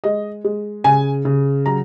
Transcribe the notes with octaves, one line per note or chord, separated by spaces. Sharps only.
G#3 D#5
G#3
C#3 G#5
C#3
F#3 A#5